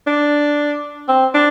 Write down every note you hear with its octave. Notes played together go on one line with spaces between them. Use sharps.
D4
C4
D4